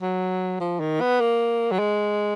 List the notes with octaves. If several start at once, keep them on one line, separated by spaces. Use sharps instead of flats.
F#3
F3
D#3
B3
A#3
F#3
G#3